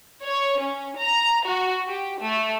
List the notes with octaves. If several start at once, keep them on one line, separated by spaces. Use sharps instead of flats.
C#5
C#4
A#5
F#4
G4
A3